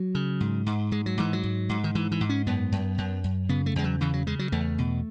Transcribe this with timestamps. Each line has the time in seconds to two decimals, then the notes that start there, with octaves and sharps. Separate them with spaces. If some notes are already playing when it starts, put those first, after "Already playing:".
Already playing: F#3
0.15 C#3
0.40 G#2
0.66 G#2
0.91 G#2 G#3
1.06 F#3
1.17 G#2 E3
1.33 F#3
1.43 G#2
1.69 G#2
1.84 D#3
1.95 G#2 E3
2.12 E3
2.21 G#2
2.29 C#4
2.47 F#2 B3
2.72 F#2
2.98 F#2
3.24 F#2
3.49 C#3 B3
3.66 A3
3.76 E2 G#3
3.84 F#3
4.01 C#3 E3
4.13 F#3
4.27 C#3 G#3
4.39 F#3
4.52 E2 A3
4.78 B2